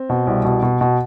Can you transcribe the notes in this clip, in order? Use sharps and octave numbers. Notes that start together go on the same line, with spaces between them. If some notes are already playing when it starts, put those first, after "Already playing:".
Already playing: C4
B2
C2
B2
B2
B2